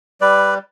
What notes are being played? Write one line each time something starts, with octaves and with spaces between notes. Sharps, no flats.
G3 B4 D5